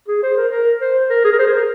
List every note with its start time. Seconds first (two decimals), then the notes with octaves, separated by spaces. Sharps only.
0.08 G#4
0.23 C5
0.37 A#4
0.51 A#4
0.81 C5
1.10 A#4
1.24 G#4
1.33 A#4
1.39 C5
1.47 G#4
1.54 A#4